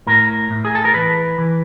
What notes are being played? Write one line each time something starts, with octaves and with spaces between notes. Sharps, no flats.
A2 A#4
A2
G#4
A4
A#4
E3 B4
E3